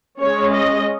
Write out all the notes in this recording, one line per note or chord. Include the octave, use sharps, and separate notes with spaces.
G#3 C#4 C#5
D#5